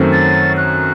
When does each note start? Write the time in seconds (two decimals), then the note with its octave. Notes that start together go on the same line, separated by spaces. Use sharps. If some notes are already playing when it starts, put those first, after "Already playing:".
Already playing: F#2 D#3 A3 C4
0.12 A6
0.57 F#6